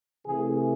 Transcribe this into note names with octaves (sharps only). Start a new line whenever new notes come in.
C3 E3 A3 G#4